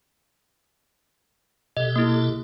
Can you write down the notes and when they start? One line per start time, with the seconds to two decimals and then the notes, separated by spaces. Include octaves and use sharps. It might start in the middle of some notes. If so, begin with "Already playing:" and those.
1.77 B2 G4 A4 D#5
1.96 A#3 E4